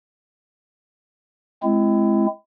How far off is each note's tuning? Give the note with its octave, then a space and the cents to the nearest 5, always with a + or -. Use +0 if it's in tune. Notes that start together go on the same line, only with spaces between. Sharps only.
G#3 +25 C4 +0 E4 +30